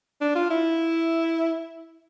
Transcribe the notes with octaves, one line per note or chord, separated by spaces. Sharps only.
D4
F4
E4